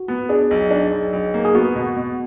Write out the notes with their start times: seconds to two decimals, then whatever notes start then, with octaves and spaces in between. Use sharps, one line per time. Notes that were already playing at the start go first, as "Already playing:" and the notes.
Already playing: F#4
0.08 B3
0.29 D4 G#4
0.51 B1
0.71 D4
0.92 B1
1.13 B1
1.34 A#3
1.45 G#4
1.55 B3 F#4
1.75 B2
1.96 B2